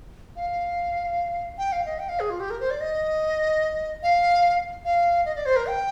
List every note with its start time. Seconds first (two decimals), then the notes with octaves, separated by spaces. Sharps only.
0.36 F5
1.58 G5
1.72 F5
1.86 D#5
1.99 G5
2.09 F5
2.20 G#4
2.30 F4
2.40 G4
2.50 A#4
2.60 C5
2.70 D5
2.81 D#5
4.03 F5
4.85 F5
5.25 D#5
5.36 D5
5.46 C5
5.56 A#4
5.66 G5